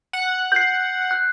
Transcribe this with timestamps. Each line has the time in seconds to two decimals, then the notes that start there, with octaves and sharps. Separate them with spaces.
0.13 F#5
0.52 G6 C7
1.11 F#6